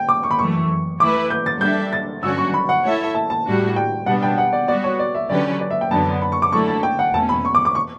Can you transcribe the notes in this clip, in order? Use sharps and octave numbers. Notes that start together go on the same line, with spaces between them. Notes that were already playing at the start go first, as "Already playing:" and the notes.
Already playing: G5
D6
C#6
B5
F#2 E3 A3 C#6
E3 A3 E4 B4 D6
G6
A6
G3 D4 A4 E5 G6
A6
G2 D3 F#3 C#4 F#4 E6
C#6
B5
F#5
A3 E4 A4 C#5 E5
A5
A5
A2 G3 D4 F#4
G5
B2 G3 B3 D4 F#5
G5
F#5
D5
G3 B3 F#4 D5
C#5
D5
E5
D3 F#3 C#4 G4 B4 D5
D5
E5
G5
F#2 D3 F#3 B3 A5
B5
C#6
D6
D3 F#3 A3 E4 A4 C#6
A5
G5
F#5
E2 B2 A3 C#4 A5
B5
C#6
D6
D6
C#6